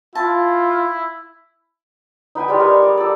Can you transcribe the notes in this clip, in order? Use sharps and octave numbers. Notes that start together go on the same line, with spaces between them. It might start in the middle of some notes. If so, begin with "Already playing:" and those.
E4 F4 A5
D#4 B4 G5 G#5
G3 G#3
A#4 C#5 D#5
D5
A4 D5